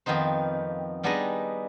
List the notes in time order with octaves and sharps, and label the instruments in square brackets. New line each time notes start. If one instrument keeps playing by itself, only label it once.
[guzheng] F2 D#3 B3 D#4 C5
G3 B3 D4 D#4 G#4 D#5